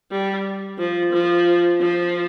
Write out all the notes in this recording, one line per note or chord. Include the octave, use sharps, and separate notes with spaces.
G3
F3
F3
F3